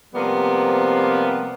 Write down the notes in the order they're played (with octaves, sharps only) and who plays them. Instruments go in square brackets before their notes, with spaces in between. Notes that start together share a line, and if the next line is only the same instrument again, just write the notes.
[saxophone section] C3 F3 G3 A#3 B3